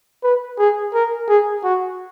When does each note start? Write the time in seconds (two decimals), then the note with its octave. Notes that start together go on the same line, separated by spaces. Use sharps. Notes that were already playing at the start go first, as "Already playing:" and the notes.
0.23 B4
0.59 G#4
0.94 A#4
1.29 G#4
1.64 F#4